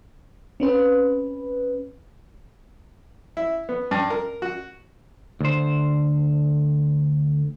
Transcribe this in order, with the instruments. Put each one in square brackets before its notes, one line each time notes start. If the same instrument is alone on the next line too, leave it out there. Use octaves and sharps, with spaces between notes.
[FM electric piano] C4 C#4 B4
[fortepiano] E4
B3
G2
A#4
F#4
[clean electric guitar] D2 C5